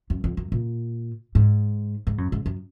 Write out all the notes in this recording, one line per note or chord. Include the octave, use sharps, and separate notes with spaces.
F#2
F2
F#2
A#2
G#2
G#2
F#2
G#2
F#2